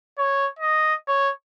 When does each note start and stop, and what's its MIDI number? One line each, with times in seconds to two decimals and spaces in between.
0.18 0.48 73
0.59 0.94 75
1.08 1.31 73